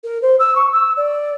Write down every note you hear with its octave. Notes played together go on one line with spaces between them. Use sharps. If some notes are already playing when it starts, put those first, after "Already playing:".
A#4
C5
E6
C#6
E6
D5